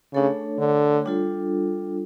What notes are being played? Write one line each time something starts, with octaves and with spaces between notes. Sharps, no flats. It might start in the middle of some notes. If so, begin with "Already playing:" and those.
C#3 A3 D4 A4 C#5
D3
G3 D4 F4 A4